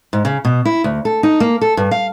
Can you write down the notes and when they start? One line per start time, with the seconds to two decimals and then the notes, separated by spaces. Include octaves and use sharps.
0.13 G#2
0.25 C#3
0.45 B2
0.65 E4
0.84 D2
1.05 A4
1.23 D#4
1.40 A#3
1.61 A4
1.77 G2
1.91 F5